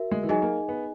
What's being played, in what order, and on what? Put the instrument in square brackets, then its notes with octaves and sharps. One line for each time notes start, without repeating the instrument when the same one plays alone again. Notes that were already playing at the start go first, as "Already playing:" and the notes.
Already playing: [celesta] F#4 A#4 E5
[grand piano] G#3
E3
[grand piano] F#3 [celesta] D#4 G#4 D#5 G#5
[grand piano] A#3
B3